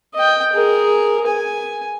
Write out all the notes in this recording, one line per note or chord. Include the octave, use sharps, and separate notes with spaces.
D#5 G5
G#4 A#4
G#5